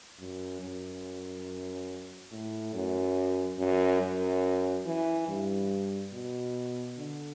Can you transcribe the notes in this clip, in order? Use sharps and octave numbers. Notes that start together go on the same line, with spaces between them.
F#2
F#2
A2
F#2
F#2
F#2
E3
G2
B2
D3